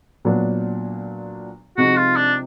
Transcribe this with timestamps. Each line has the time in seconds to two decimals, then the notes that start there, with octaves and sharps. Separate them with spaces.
0.25 A#2 F#3 B3 D4
1.77 C3 F3 G#3 C4 D#4 F#4
1.96 F4
2.17 D4